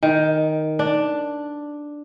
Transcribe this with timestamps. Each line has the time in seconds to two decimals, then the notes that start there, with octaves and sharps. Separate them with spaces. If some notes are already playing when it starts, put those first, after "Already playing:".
0.03 D#3
0.79 D4